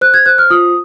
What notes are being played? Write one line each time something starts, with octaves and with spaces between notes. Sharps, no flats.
C5 F#6
G#6
C5 F#6
F6
F4 D#6